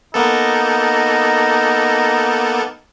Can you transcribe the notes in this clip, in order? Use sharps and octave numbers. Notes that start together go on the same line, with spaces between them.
A#3 B3 D#4 A4